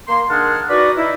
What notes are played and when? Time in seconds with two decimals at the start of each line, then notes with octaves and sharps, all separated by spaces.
0.07 A#3 C6
0.29 D#3 D4 G#4 F#5 A5 F6
0.69 E3 D#4 F#4 B4 D5
0.97 D#4 E4